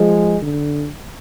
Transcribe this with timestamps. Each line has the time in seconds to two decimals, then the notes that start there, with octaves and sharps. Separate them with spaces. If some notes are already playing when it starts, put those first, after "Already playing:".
Already playing: F3 G#3
0.42 D3